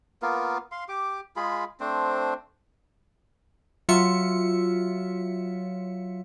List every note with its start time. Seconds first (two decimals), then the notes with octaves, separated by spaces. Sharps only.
0.22 A#3 B3 F4 A#4
0.72 F5 C6
0.89 G4 D6
1.36 G#3 F4 G#4 B5
1.80 A3 C4 D4 C5
3.89 F#3 F4 E5 C#7